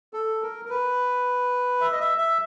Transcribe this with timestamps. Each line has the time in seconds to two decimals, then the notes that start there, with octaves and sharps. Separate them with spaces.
0.13 A4
0.42 A#4
0.65 A#4
0.69 B4
1.81 E5
1.92 D#5
2.00 E5
2.18 E5